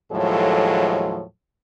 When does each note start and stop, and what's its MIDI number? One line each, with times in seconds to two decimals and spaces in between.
0.12 1.23 39
0.12 1.23 45
0.12 1.23 53
0.12 1.23 54
0.12 1.23 56
0.12 1.23 69